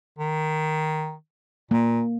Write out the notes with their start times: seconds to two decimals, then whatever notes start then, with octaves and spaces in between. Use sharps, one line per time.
0.19 D#3
1.71 A#2 A#3